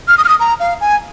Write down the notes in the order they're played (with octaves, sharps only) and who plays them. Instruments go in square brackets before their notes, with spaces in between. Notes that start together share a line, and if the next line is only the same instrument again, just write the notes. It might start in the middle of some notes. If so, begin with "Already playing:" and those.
[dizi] F6
D#6
F6
D#6
A#5
F5
G#5